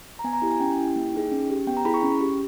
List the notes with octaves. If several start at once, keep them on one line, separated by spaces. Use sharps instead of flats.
A#5
B3 G#5
A#5
E4 G4
G#5
C#4 G5
E4 G4
A#3
D#4 G#4
C#4
G4
B3 G5
A#5
E4 G#4 B5
C#6
C#4
G4